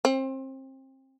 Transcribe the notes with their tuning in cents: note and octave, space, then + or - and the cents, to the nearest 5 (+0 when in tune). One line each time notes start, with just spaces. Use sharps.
C4 +30